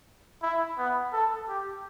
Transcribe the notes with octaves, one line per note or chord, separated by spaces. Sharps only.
E4
B3
A4
G4